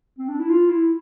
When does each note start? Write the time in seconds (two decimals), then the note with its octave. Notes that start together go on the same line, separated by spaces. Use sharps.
0.18 C4
0.29 D4
0.39 E4
0.50 F4
0.69 E4